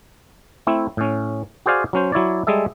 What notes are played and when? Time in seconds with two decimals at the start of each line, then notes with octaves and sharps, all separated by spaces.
0.67 A3 C4 E4
0.97 A2 C#4
1.66 F#4 G#4 C5 D5 F5 G#5
1.93 F#3 C#4 C5
2.12 F#3 E4 C#5 D5
2.47 G3 G#3 G#4 A4 E5